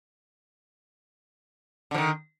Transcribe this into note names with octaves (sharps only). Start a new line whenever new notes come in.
D3 D#3 F3